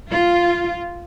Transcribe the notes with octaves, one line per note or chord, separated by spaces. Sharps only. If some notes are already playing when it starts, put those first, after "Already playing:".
F4